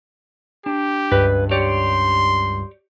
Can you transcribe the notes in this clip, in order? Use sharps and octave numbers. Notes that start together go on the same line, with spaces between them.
D4 G4
C#2 G2 B4
G4 C#5 D5 C6